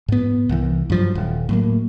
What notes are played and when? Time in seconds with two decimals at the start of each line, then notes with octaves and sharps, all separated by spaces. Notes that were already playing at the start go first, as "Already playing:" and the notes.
0.08 G#2 B3
0.49 C2 E3
0.90 G2 F3 F#3
1.15 D#1
1.49 A2 F#3 A#3